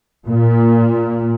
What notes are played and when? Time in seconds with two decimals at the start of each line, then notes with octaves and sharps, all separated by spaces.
0.27 A#2